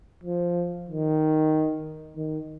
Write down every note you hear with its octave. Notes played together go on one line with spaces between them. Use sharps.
F3
D#3
D#3